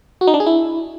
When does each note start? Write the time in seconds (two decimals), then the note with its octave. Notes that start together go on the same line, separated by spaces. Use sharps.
0.21 F#4
0.27 D#4
0.34 D4
0.40 G#4
0.46 E4